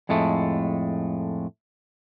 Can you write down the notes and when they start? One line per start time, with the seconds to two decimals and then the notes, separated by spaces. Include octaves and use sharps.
0.09 F2 A2 G#3 A3